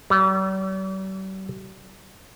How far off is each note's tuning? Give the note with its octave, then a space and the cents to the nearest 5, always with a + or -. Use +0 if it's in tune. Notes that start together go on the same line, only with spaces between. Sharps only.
G3 -45